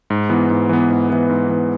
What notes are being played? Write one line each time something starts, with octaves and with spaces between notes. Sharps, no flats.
G#2
E3 B3
G#2
E3 B3
G#2
E3 B3
G#2
E3 B3